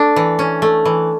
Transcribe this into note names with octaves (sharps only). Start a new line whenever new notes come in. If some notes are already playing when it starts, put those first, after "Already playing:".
Already playing: A3 D4
E3
C#4
A3
E3